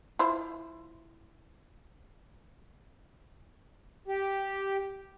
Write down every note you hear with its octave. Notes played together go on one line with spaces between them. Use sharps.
E4 F4 C5
G4